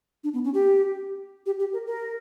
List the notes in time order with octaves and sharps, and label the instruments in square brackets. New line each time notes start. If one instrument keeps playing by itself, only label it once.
[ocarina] D4
B3
C#4
G4
G4
G4
A#4
A#4